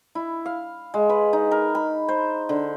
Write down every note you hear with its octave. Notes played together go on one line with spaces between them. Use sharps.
E4
F5
G#3
B4
D#4
A#4
B5
C5
D3